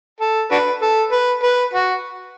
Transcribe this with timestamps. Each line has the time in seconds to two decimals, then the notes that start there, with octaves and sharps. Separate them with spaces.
0.20 A4
0.51 D4 F#4 B4
0.82 A4
1.12 B4
1.43 B4
1.74 F#4